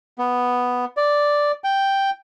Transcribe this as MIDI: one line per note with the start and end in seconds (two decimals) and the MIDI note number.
0.18 0.85 59
0.97 1.52 74
1.64 2.10 79